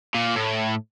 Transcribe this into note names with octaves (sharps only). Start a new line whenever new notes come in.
A#2
A2